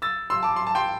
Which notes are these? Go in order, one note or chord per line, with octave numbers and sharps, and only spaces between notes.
E6 A6
C6 E6
A5 D6
C6
A5
G5 C6